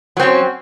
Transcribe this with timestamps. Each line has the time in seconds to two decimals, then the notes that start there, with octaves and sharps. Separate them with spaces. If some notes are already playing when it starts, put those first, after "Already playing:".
0.17 F#3
0.20 C4
0.22 C#4